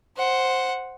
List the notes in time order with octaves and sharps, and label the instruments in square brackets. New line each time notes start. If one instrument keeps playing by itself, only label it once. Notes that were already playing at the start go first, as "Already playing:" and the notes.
[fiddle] C5 F#5